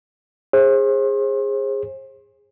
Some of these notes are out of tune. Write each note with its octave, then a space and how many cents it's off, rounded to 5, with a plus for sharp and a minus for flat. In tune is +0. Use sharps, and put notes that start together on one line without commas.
G#4 -20 C5 +35